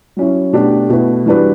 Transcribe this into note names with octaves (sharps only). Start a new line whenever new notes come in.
F#3 C#4 E4
B2 A3 D4 G4
B2 A3 E4 B4
E3 G3 D4 F#4 B4